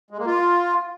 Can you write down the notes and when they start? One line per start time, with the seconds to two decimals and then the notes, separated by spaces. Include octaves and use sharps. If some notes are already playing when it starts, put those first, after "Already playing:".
0.11 G#3
0.18 A#3
0.26 F4